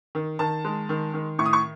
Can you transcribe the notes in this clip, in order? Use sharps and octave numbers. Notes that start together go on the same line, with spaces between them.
D#3
D#3 A5
G#3
D#3
D#3
A2 C#6
D#6
C#6